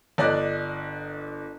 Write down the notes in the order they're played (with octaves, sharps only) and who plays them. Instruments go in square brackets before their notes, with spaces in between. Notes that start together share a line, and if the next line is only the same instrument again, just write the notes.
[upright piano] G1 D5 D#5 F#6